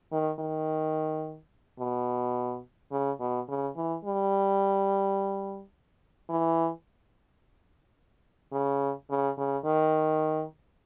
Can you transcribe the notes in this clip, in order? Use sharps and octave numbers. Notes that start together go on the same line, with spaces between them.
D#3
D#3
B2
C#3
B2
C#3
E3
G3
E3
C#3
C#3
C#3
D#3